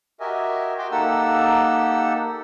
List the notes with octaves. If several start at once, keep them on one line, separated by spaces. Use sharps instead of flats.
F#4 G4 A#4 D#5 E5 G#5
F#4 G5 C6 D6
A#3 D#4 G4 A4 F#5 E6